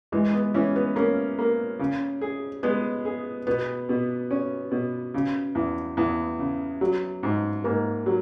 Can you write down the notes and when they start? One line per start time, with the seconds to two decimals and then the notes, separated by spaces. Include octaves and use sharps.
0.12 E3 G#3
0.33 B3
0.54 E3 C#4
0.76 B3
0.96 A#3 C#4
1.39 A#3
1.79 C#3
2.21 G#4
2.63 G#3 B3
3.05 G#4
3.47 B2 B3
3.89 B2
4.31 C#4
4.71 B2
5.14 C#3
5.55 E2
5.97 E2 B3
6.39 C#3
6.81 F#3
7.23 G#2
7.64 G#2 A#3
8.06 F#3